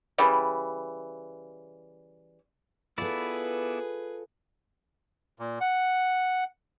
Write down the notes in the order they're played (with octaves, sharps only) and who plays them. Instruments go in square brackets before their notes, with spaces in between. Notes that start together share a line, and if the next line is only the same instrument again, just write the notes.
[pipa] C#3 E3 G3
[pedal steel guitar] B3 E4 D5 [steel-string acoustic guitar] F4 A4 [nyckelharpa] G#4 B4
[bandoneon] A#2
F#5